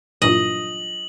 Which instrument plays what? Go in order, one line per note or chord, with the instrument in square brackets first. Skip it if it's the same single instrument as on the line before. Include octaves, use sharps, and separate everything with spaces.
[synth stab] G2 A#2 E3 [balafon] F#3 D4 F4 [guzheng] D#5 [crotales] F#7